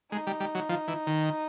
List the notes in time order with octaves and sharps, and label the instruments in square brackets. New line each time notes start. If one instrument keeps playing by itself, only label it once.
[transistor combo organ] G#3 [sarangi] D#4
[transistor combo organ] G3
G3
F#3
F3
E3
D#3